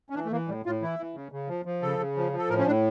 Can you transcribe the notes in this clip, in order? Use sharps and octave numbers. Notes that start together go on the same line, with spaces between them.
C#4
E3 D4
A3
E3 A#3
A2 G3
A2 F4
E3 E4
E3
C#3
C#3
F3
F3
C#3 A4
C#3
F3
F3
A4
A2 A#4
C#4
A2 D4